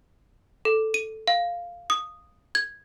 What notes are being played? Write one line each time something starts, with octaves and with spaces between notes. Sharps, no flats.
A4
D#7
F5
D#6
G#6